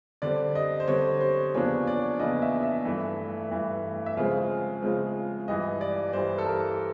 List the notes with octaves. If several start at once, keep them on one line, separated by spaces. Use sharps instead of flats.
D3 G3 C4 D5
D#5
C5
D3 G3 C4 C#5
C5
E2 C#3 F3 A#3 D4 C#5
D5
E2 C#3 F3 A#3 D4 D#5
E5
E5
G2 E3 A3
G2 E3 A3
E5
C#3 F3 G#3 C4 F5
C#3 F3 G#3 C4
G2 E3 G3 D#5
D5
G2 E3 G3 C5
A4
A#4